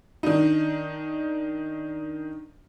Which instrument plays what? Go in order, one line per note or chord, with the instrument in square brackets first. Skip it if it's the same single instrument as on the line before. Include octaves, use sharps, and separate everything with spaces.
[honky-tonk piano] D#3 D4 D#4